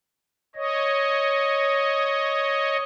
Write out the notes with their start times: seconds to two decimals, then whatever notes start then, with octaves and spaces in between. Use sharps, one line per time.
0.55 C#5 D#5